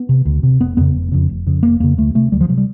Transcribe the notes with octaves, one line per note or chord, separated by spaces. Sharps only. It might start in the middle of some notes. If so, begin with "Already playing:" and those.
Already playing: B3
C3
D2
C3
F1 B3
F2 C#3 B3
F1
F2 C#3
F1
F2 C#3
F1 A#3
F2 C#3 A#3
D2 A3
C3 A3
D2 G3
F3
C3 F#3
G3